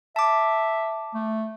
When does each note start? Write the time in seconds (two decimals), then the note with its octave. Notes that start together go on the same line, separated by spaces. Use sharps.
0.16 E5 A5 D6
1.14 A3